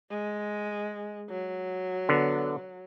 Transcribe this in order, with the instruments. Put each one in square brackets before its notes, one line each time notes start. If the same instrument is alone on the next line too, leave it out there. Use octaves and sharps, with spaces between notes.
[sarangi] G#3
F#3
[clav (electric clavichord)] D3 B3